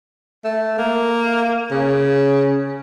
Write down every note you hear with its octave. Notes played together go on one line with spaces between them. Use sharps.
A3
A#3
C#3